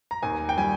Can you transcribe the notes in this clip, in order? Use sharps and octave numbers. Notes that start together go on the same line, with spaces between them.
A#5
D#2 G#5
G5
G3 G#5